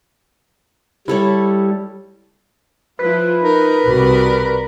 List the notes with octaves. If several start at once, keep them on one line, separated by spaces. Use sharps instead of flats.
G3 E4 A4 C#5
F3 E4 F4 B4
D#4 A#4
C2 F#4 D5